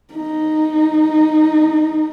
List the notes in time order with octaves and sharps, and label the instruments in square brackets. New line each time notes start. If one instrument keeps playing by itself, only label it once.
[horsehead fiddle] D#4